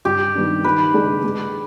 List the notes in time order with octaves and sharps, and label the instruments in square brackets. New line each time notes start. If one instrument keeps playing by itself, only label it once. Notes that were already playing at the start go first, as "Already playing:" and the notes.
[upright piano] G2 [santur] G4
[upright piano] D#3 G3 B3 D4
[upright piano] D#3 [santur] B4
[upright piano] G#3 D4 G#4 D5
G#3